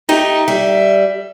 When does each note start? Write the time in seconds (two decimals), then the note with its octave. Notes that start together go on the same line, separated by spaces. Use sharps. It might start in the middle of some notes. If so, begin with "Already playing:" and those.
0.09 A3 D#4 G4
0.48 G3 E5